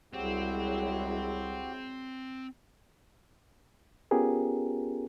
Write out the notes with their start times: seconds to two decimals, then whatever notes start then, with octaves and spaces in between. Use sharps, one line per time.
0.13 C2 F#3 G#3 C4 E4 F#4 G4
4.11 B3 C#4 F4 G4 G#4 A#4